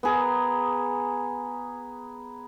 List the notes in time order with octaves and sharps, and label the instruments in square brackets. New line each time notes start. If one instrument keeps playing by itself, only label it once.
[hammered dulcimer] B3 G#4 A#5